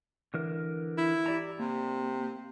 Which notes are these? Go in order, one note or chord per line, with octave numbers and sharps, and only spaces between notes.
D3 E3 A#4
E4
G4 D5 A#5
C3 A#3